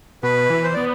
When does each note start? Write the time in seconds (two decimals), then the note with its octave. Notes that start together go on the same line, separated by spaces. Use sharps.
0.23 B2 B4
0.50 E3
0.64 C5
0.74 B3 D5